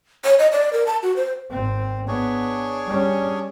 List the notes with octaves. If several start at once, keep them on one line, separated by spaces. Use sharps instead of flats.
C#5
D#5
D5
A#4
A5
F#4
C5
G#1 C4
B3 D4 G#4 C#5
G3 C#4